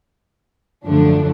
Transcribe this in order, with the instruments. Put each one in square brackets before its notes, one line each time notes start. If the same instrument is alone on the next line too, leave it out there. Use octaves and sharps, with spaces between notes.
[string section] F#2 D3 F3 A3 D4